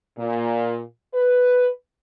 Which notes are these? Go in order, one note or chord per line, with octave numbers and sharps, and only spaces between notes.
A#2
B4